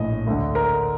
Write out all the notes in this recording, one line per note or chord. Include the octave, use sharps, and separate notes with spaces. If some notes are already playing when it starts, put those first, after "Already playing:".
Already playing: A#1 A2 D#5
D2 D3
A#4